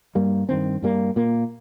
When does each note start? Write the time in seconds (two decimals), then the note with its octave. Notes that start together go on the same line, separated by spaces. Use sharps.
0.15 G2 G3 A#3
0.49 G2 D#3 C4
0.82 G2 G3 A#3
1.16 A#2 A#3